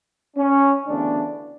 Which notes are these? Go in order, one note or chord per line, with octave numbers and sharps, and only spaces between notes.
C#4
D2 C#3 E3 B3 D4